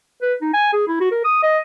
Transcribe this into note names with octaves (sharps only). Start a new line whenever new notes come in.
B4
D#4
G#5
G#4
E4
F#4
A#4
D#6
D#5